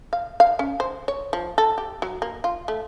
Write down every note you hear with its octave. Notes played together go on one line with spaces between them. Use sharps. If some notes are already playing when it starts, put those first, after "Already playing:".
F5
F5
C#4
C5
C#5
F3
A4
G4
F#3
A#3
F4
A3